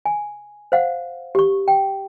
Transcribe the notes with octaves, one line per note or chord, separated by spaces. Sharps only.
G#5
C5 F5 F#5
G4 C#6
G5